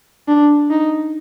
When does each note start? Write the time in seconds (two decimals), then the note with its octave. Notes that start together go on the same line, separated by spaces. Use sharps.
0.28 D4
0.70 D#4